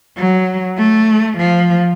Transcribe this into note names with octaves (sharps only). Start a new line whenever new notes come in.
F#3
A3
F3